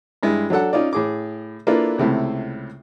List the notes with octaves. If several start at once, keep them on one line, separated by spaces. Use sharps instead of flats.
G2 G#3 E4
F#3 D4 A4 F#5
C#4 D#4 F4 D5
A2 G#4 D6
A#3 D4 E4 F4 A4 B4
C#2 C3 A3 E4